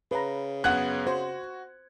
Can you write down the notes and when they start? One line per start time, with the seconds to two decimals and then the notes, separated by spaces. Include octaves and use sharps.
0.11 C#3 B4 A#5
0.64 F#2 B3 F#5 F#6 G#6
1.07 F#4 C5